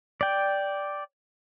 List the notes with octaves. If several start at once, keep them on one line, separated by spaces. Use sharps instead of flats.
D5 G5